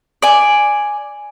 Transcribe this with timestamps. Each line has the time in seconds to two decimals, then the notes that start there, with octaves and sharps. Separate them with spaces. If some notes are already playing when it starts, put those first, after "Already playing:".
0.22 D5 G#5